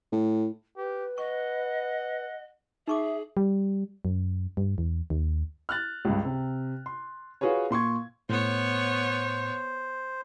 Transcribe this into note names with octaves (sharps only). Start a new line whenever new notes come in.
A2
G4 B4
D#5 F#5 C#6
D#4 G#4 E5 C#6 D6
G3
F#2
G2
E2
D#2
F6 F#6 A6
C#2 G2
C3
C6
F4 F#4 G#4 B4 C#5
A#2 C6 C#6 G#6
A2 B3 C5 C#5